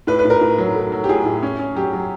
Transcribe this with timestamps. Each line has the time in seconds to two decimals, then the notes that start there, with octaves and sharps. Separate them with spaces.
0.07 A2 B4
0.19 B4
0.25 A2
0.30 A#4
0.41 A2
0.58 F#3
0.75 A3
0.92 F#3
1.04 G4
1.09 A2 G#4
1.26 A2
1.43 C#4
1.59 C#4
1.75 F#3 G4
1.93 F#3